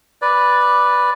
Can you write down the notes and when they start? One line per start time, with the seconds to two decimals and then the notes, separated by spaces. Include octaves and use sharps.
0.22 B4 D5